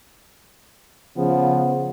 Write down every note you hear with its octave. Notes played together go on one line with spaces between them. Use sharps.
C#3 F3 B3